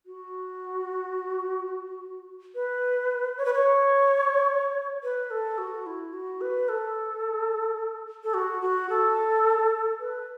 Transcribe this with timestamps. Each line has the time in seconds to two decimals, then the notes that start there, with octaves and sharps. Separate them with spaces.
0.06 F#4
2.55 B4
3.37 C#5
3.46 B4
3.54 C#5
5.03 B4
5.31 A4
5.58 F#4
5.86 E4
6.13 F#4
6.41 B4
6.69 A4
8.24 A4
8.34 F#4
8.62 F#4
8.90 A4
10.00 B4